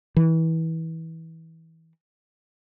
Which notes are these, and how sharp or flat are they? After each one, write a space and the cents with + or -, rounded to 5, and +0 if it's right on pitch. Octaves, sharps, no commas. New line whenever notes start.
E3 -25